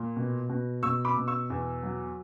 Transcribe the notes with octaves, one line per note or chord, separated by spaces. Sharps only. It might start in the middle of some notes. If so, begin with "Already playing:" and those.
Already playing: A#2
B2
B2
B2 C#6 E6
B5 D6
B2
C#6 E6
E2
F#3